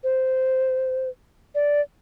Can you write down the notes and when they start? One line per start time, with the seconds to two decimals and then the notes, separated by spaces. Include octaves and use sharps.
0.03 C5
1.55 D5